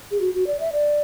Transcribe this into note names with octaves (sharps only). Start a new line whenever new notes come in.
G#4
F#4
F#4
D5
E5
D5